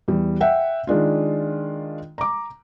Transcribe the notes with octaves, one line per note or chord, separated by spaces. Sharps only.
E2 G3
E5 F#5 G5
D#3 G#3 D4 F4
A#5 D6